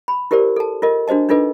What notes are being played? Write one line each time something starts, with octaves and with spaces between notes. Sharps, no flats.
B5
E4 G4 A#4 C5 D5
A4 A5
F4 A#4 D#5
D4 F#4 C5 D#5 A5
D4 D#4 F4 A4 B4 D#5